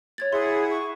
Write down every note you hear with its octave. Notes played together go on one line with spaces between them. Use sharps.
C#5 G#6 A6
E4 G#4 E5 F#5 C6
C#6